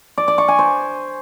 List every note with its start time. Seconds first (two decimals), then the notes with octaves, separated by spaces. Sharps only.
0.18 D5
0.28 D5
0.38 C#6
0.48 G#5
0.59 C5